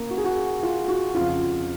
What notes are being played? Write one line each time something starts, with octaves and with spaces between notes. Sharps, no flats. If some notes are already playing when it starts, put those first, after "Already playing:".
Already playing: C#3 A#3
F#4
G#4
F#4
F4
F#4
F2 C#3 F3 F4 F5